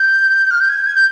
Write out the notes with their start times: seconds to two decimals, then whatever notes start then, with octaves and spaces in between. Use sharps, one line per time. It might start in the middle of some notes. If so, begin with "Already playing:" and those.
Already playing: G6
0.51 F6
0.60 G6
0.69 G#6
0.78 G6
0.86 G#6
0.95 G6